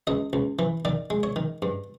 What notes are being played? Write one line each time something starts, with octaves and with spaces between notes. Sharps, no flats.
C#2 D#5
C#2
E3
D#3 D5
G#3
C#5
D#3
G2